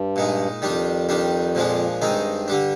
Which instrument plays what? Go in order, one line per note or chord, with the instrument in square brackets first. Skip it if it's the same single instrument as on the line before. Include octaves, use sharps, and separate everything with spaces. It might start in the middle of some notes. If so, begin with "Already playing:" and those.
Already playing: [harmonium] G2
[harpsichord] A#2 G#3 D#4
[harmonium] F2 [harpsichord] D#3 G3 D4
[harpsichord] D#3 G3 D4
A#2 F3 G#3 D4
[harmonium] G2 [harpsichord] D#3 G#3 C4 D#4
[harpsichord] D3 G3 D4